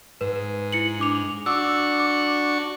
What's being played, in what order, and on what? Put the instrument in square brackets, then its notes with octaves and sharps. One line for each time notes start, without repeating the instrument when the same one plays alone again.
[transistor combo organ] G#2 [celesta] B4
[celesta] E4 C#7 F#7
D4 D6 F7
[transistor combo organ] D4 F#4 C#6 [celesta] D6 E6
[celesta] D6